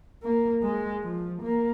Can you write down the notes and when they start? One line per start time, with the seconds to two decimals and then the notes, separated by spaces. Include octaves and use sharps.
0.22 A#3
0.63 G#3
1.04 F3
1.43 A#3